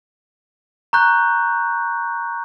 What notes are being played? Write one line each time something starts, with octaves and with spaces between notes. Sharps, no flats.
A#5 C#6 F#6 G6